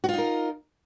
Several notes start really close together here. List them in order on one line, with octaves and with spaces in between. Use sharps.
F#4 F4 D#4 A#4